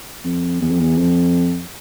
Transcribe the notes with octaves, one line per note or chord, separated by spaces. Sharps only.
F2
E2
F2
E2
F2